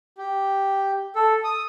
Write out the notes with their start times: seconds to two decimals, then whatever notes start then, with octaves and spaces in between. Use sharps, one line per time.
0.18 G4
1.15 A4
1.44 D#6